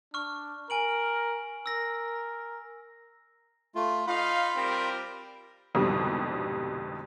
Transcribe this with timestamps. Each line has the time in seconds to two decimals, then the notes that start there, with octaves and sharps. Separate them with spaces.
0.14 D4 C#6 F6
0.70 A#4 G#5 D7 F#7
1.66 A#4 E6 A#6
3.75 A3 F4
4.07 D#4 F4 F5 B5
4.56 G3 C4 A#4
5.75 C2 F2 G#2 B2 D3 G3